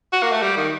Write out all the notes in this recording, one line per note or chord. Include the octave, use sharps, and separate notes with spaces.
F#4
A#3
A3
G3
D#3